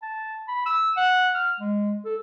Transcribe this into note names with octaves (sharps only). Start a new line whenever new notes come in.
A5
B5
E6
F#5
F6
G#3
A4